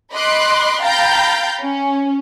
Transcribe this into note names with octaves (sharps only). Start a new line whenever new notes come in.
D#5 B5 C6 D6 F#6
F5 G5 A#5 B5 G6 A6
C#4